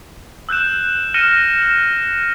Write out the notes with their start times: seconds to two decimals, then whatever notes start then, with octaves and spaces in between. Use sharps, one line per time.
0.49 E6 F#6 G6 E7
1.14 F6 A#6 C#7 D#7 E7 G7
1.62 E7